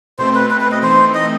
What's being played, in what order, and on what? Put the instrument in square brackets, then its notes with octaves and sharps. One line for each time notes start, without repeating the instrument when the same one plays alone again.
[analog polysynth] B2 A3 C4 [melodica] C5
[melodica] B4
B4
B4
D#5
[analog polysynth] E3 A3 C4 D#4 [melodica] C5
[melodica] D#5